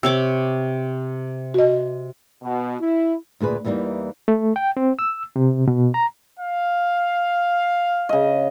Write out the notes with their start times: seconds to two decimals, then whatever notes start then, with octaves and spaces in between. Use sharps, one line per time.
0.03 C3 C#5 D6 E6
1.54 F#4 D#5
2.43 B2
2.80 E4
3.40 D2 A#2 G#4 B4
3.64 E2 E3 G3 A3 A#3 D#4
4.28 A3
4.56 G5
4.77 C4
4.99 E6
5.36 C3
5.68 B2
5.94 A#5
6.38 F5
8.09 C#3 D#5